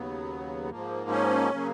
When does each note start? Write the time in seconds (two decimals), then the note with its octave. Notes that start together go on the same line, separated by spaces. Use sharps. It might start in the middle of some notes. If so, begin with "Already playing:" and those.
Already playing: D#2 C#3 F#3 B3
0.70 G#2 F3 A#3
1.11 C#4
1.52 C#3 F#3 A#3